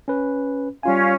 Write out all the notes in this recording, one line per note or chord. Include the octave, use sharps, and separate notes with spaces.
C#4 B4
G3 C#4 F4 F5 G#5